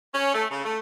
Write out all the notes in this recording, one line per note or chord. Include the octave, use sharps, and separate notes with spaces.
C#4
A3
C#3
A3